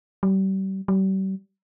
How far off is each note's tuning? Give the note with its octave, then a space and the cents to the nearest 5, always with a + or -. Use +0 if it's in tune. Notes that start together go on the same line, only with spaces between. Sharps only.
G3 -35
G3 -40